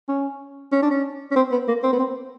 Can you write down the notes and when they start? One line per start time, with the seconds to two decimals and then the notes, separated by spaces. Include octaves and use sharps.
0.08 C#4
0.72 C#4
0.82 D4
0.91 C#4
1.31 C#4
1.36 C4
1.52 B3
1.68 A#3
1.83 C4
1.93 B3
1.99 C4